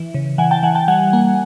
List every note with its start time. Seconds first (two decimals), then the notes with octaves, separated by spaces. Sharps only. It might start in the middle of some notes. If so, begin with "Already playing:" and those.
Already playing: E3
0.14 C#3
0.38 E3 F#5 G#5
0.51 G5 A5
0.63 E3 F#5 G#5
0.75 G5 A5
0.88 G3 F#5 G#5
1.13 A#3